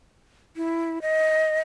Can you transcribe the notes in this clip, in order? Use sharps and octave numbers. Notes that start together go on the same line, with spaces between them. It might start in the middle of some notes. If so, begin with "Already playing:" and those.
E4
D#5